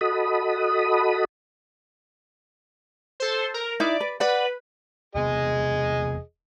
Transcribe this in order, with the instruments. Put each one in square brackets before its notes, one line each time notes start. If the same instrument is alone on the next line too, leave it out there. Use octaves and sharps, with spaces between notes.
[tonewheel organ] F#4 A4 D#5 B5 D#6
[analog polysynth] A4 C5
A#4
[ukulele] D#4 E4 [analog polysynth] D5
[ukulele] B4
[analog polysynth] B4 [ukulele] D5 F#5
[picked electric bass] E1 C3 B3 [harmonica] G#4 D#5